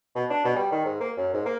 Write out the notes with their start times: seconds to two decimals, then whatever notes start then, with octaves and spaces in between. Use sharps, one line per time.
0.16 B2
0.30 D4
0.45 B2
0.56 G3
0.72 D#3
0.85 G#2
1.01 A#3
1.17 F#2
1.34 G#2
1.45 A#3